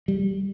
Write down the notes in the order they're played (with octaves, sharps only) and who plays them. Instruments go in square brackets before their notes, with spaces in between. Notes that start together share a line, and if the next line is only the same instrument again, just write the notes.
[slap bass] G3